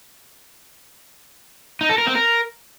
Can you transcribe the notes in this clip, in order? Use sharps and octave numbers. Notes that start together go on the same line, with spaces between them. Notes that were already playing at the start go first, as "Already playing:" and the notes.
D#4
A4
A#4
C4
A#4